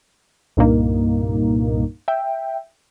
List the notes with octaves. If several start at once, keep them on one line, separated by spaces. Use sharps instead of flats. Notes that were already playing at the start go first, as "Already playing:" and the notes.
C2 G2 A#2 A#3 D#4
E5 G5